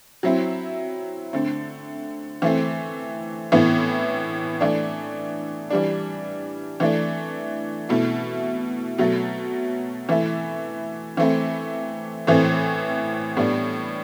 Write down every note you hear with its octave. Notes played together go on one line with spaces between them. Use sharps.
F#3 C4 E4
D3 A3 C4
E3 A3 C4
A2 E3 B3 E4
E3 A3 D4
E3 G3 D4
E3 A3 D4
B2 A3 E4
B2 F#3 A3
E3 A3 E4
E3 A3 C4 E4
A2 E3 A3 C4
A2 G3 B3 D4